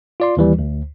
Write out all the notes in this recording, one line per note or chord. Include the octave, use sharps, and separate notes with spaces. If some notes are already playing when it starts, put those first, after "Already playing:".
F4 D5 C6
D#2 E3 G3
D2